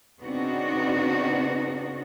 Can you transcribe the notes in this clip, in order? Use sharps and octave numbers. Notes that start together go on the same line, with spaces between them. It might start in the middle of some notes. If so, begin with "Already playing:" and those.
C#3 B3 C4 D4 D#4 F#4